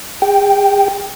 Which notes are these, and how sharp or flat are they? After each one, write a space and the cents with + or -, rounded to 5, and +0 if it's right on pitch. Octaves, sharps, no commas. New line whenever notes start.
G#4 -40 G5 +0